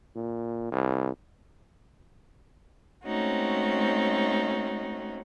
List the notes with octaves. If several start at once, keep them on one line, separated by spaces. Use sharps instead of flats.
A#2
C2
G#3 A3 C4 C#4 D#4 F#4